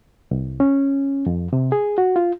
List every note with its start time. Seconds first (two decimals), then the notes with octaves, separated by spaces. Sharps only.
0.31 C2
0.60 C#4
1.26 F2
1.53 C3
1.72 G#4
1.98 F#4
2.16 F4